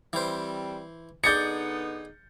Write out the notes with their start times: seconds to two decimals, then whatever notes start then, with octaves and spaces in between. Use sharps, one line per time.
0.13 E3 G3 C4 C5
1.24 D3 B3 D#4 G#4 D5 G6 A6 C#7